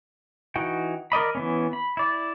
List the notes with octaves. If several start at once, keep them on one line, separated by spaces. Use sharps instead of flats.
E3 D#4 F#4 G5
A#4 D5 D#5 B5
E3 B3 C#4
B5
E4 D5